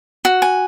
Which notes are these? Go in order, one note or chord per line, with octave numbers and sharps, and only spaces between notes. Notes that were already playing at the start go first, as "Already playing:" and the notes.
F#4
G#5